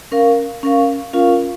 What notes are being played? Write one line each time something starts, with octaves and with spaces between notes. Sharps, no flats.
C#4 A#4 F5
C#4 A#4 F5
C#4 F4 A#4 F5